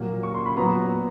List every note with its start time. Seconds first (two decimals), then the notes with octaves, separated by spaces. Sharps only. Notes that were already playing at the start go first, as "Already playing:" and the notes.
Already playing: A#2 F#3 A#3
0.23 C#6
0.34 C6
0.46 B5
0.57 A#2 F#3 B3 A#5